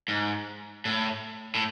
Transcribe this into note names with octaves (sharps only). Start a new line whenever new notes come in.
G#2
A2
A2